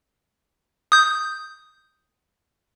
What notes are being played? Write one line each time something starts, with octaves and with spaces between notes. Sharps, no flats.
D#6 G6